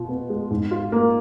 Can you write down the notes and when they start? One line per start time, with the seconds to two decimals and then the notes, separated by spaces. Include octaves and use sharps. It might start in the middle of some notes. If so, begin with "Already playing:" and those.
Already playing: B2 F4
0.09 B3
0.29 G#3
0.51 G#2
0.71 F4
0.92 A#3